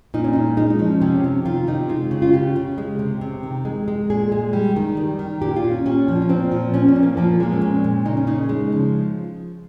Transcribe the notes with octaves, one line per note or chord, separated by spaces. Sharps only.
A#2 D#4
C#4
G#3 D#4
G#3 D#4
D#4
F3 C#4
C3 C#4
C3
D#3 F4
C3 D#4
G#3 F4
C#3
F4
C#3 G4
C#3
G#3
C3
C3
D#3
G#3
G#3
A#2 G#4
G#3
G3
D#3
G3
D#3
A#2 G4
F4
A#2
C#4
A#2 C#4
F3
C#4
A#2 C4
F3
A#2 C#4
C#4
A#2
A#3
F3 A#3
G#3 A#3
C4
A#2 C#4
A#2
C#3 D#4
C#4
C#3 D#4
G#3
F3